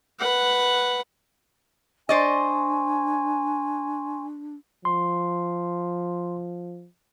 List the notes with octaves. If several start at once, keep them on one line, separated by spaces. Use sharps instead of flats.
B4 F#5
D4 C5 D5 D#5 G#5 C6 C#6
F3 C6